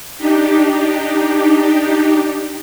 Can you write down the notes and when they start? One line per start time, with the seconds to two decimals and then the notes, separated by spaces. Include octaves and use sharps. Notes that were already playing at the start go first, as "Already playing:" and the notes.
0.18 D4 D#4 G4